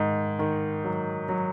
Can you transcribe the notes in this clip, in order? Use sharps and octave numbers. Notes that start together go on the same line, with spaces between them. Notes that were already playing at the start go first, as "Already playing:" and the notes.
Already playing: G#2 D#3
D#3
F#3
F#3